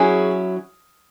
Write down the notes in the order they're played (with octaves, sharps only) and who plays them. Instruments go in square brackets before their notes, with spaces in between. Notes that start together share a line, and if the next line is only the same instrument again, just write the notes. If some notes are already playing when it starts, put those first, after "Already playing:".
Already playing: [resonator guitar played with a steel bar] F#3 C#4 E4 [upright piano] G#4 G#5